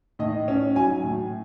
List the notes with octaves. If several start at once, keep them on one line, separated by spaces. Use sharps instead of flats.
A2 D#5
C#4
F#3 G#5
A2